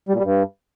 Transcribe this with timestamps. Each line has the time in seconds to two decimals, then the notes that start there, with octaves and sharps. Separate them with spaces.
0.09 G3
0.14 A#2
0.19 G3
0.25 G2